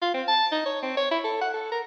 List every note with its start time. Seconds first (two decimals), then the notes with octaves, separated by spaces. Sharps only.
0.02 F4
0.14 C4
0.28 A5
0.52 D#4
0.66 C#5
0.82 C4
0.97 C#5
1.11 E4
1.24 A4
1.41 F#5
1.53 A4
1.72 A#4